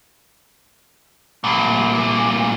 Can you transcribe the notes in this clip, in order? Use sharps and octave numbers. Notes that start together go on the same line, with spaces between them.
C2 A#2